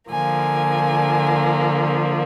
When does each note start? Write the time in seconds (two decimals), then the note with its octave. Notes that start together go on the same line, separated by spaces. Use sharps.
0.10 D3 F3 A#3 G#5